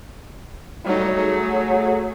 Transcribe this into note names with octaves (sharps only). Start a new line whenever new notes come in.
F#3 G3 A3 D#4
A3 G#4